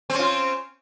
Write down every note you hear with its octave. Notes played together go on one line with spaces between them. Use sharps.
C4 C#4 F4